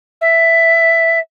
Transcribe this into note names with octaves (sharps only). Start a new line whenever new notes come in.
E5